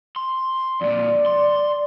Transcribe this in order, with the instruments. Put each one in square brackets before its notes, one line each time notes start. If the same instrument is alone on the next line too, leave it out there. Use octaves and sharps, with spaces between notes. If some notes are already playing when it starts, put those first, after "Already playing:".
[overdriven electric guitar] C6
[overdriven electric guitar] F2 A#2 [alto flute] D5
[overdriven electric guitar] C6